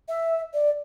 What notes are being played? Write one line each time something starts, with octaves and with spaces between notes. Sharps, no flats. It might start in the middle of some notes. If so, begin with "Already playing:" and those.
E5
D5